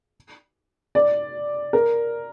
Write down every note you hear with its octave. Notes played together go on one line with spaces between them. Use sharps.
D5
A#4